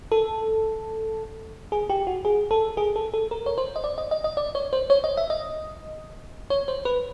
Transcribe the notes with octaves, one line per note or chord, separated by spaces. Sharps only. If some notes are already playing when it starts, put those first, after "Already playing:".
A4
G#4
G4
F#4
G#4
A4
G#4
A4
A4
A#4
C#5
C5
D#5
D5
D#5
D#5
D#5
D5
C#5
C5
C#5
D#5
E5
D#5
C#5
C5
B4